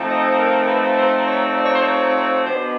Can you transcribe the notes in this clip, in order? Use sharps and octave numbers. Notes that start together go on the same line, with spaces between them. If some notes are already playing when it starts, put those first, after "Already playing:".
Already playing: F3 A3 C4 D#4
D#5
A#4
A#4
B4
C5
C#5
D5
C#5
C5
C#5
B2 G#3 B3 D4 C5